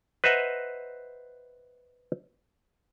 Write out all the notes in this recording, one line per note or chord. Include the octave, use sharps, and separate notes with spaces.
B4 C5 D#5 E5 F#5 A#5